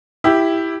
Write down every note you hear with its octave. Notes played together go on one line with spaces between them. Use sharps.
E4 G4